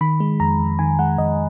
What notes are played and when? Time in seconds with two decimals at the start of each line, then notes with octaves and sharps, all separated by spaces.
0.01 D#3 B5
0.20 G#3
0.40 F2 A#5
0.60 F2
0.79 D#3 G#5
0.99 G#3 F#5
1.18 F2 D#5